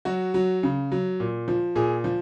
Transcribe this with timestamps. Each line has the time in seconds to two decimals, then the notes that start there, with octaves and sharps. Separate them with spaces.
0.05 F#3 F#4
0.34 F#3
0.63 C#3
0.92 F#3
1.20 A#2
1.48 F3
1.76 A#2 G#4
2.04 F3